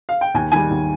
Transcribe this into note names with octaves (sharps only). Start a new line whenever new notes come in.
F5
G5
D#2 G#5
D#3 G3 G#5
D#2